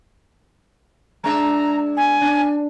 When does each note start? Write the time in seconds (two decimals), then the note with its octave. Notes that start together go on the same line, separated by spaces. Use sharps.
1.24 G#3 D4 E5 A#5
1.97 G#5
2.21 D4